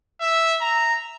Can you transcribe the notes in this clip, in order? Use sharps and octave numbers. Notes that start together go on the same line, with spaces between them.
E5
A#5